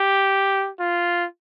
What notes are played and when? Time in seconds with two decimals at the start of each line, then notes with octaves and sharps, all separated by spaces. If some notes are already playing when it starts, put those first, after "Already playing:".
Already playing: G4
0.80 F4